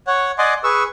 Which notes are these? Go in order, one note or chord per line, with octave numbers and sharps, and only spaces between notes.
C#5 F#5
D5 D#5 F#5 G#5 C6 D6
G#4 B4 C#6 E6